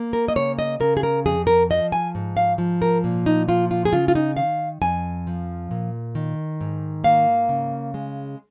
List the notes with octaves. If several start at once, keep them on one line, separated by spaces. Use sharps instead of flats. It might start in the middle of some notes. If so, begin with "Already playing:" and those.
Already playing: A#3
A#4
D#5
C#3 C#5
D#5
C#3 A#4
G#4
A#4
F2 G#4
A#4
F3 D#5
G#5
G#2
F5
F3
A#4
A#2
D#4
F3 F4
F4
G#4
C#3 F4
F4
D#4
D#3 F5
F2 G#5
F3
A#2
D#3
G#2
A#3 F5
C#3
G#3